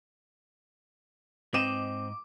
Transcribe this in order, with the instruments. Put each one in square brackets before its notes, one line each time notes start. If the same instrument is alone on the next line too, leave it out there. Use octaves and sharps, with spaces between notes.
[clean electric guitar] G#2 D#5 [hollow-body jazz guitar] C4 [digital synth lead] D6 [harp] E7